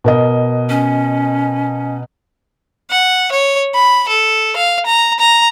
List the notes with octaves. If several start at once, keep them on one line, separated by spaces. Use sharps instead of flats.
B2 A#4 D#5
C#4
F#5
C#5
B5
A4
F5
A#5
A#5